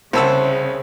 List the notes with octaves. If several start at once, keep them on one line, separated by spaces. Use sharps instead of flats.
C2 C#3 C5 E5 F#5 A5 E6